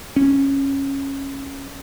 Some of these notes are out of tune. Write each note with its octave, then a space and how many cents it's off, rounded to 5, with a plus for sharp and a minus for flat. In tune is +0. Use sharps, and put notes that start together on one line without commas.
C#4 -15